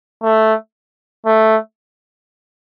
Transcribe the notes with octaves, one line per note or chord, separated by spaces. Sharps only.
A3
A3